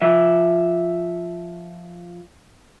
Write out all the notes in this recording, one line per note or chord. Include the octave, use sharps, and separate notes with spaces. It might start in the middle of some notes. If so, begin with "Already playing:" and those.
F3 E5